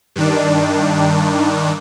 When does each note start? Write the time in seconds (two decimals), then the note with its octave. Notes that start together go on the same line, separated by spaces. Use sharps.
0.16 G2 D#3 D4